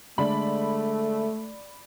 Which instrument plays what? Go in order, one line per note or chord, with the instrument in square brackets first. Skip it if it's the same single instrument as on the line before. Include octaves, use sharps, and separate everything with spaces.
[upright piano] D3 G#3 [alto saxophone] A3 [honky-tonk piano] D5 B5